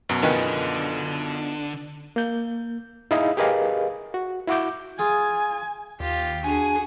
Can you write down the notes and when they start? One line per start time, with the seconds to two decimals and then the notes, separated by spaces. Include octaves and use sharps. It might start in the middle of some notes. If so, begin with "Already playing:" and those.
0.09 F#2 B2 F#3
0.23 D3 D#3 B3 D#4 F4 G#4 B4
2.16 A#3 G6
3.11 D#4 E4 G#4 D#5 F5
3.37 G4 G#4 A#4 B4 D#5 F5
4.14 F#4
4.48 E4 F#4 F#5 D6 G6
4.99 F4 G#4 F5 G#5
6.00 D#2 F4 G4
6.44 D4 F#4 G#4 G#5